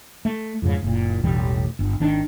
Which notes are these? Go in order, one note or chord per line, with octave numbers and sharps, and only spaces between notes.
A3
F2 G#2 C#3
F#1 A#2
E1 A1 E3 G3
G1
G#1 D#3 D4